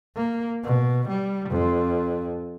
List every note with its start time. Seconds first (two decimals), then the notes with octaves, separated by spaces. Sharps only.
0.15 A#3
0.64 B2
1.08 G3
1.49 F2